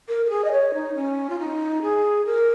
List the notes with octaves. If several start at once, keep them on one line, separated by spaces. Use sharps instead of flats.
A#4
A#4
G#4
D#5
C#5
D#4
C#4
F4
D#4
G#4
A#4